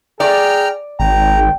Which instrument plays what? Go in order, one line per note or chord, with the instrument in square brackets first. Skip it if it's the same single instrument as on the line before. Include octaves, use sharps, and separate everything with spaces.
[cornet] G#4 [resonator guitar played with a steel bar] D5 [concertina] G5 A#5 F6
[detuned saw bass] G#1 [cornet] G5 [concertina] A#5